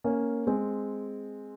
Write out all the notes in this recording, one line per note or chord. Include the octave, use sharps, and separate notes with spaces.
A#3 C#4
G#3 C4